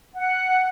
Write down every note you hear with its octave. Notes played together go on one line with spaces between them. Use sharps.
F#5